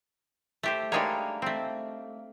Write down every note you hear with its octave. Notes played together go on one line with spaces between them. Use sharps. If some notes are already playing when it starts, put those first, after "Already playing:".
A3 G4 C5
G3 G#3 A#3 D4 D#4 C#5
A3 C4